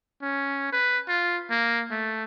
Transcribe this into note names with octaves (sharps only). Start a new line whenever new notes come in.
C#4
B4
F4
A#3
A3